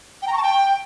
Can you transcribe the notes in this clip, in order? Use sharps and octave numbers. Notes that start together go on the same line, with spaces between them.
G5
A#5
C#6
A5
G5